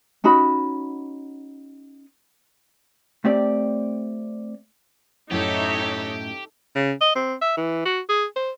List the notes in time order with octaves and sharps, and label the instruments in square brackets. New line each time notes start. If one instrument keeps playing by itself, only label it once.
[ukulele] C#4 D#4 F#4 B5
[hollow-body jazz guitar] A3 C4 G4 D5
[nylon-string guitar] F#2 A2 E4 [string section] D#4 C#5 E5 [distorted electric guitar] G4 [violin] A4
[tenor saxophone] C#3
D#5
C4
E5
E3
F#4
G#4
C5